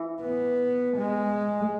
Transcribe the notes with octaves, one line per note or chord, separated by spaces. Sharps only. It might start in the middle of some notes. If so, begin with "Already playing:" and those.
Already playing: E3
B3
G#3